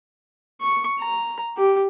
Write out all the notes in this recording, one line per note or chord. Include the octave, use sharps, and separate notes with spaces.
C#6
A#5
G4